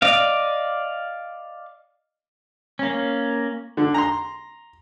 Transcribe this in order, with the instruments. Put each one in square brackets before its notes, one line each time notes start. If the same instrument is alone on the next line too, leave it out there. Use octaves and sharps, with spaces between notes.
[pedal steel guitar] D5 D#5 F5
A#3 C#4
[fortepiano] D3
A#5 C6